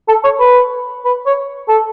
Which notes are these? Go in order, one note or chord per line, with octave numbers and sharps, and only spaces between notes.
A4
C#5
B4
B4
C#5
A4